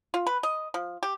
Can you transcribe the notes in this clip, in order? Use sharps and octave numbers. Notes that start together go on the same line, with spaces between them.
F4
B4
D#5
F3
G4